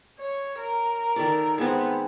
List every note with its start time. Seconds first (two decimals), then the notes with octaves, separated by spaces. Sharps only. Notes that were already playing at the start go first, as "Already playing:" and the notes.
0.20 C#5
0.58 A#4
1.16 D#3 A4 D5
1.58 G#3 B3 C4